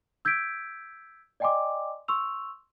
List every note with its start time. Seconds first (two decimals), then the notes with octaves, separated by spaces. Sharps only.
0.25 E6 G6 G#6 B6 D7
1.40 D5 D#5 G5 G#5 C6 D6
2.08 C6 C#6 E6 F7